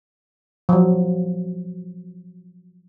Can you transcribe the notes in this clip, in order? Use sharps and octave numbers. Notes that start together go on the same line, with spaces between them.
F3 F#3